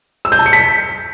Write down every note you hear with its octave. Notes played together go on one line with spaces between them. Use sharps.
E6
G6
A5
C#7
B6